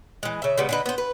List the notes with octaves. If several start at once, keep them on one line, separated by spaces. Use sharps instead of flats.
E3 G#3
C#3 E5
C#3 G3 G#3 B3
D3 D#4 B4
B3 C5
B4